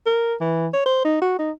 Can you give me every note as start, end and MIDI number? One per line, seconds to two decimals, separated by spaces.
0.06 0.34 70
0.40 0.68 52
0.73 0.85 73
0.86 1.03 72
1.04 1.17 63
1.21 1.35 66
1.39 1.51 63